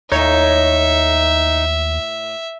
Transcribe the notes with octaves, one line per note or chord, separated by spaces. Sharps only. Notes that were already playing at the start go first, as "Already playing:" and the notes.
D#2 A2 D#4 C#5 E5